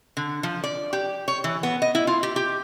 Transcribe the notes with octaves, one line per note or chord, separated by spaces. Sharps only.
D3
F3
D5
G4
C#5
E3
B3
D#5
E4
F4
G4
G4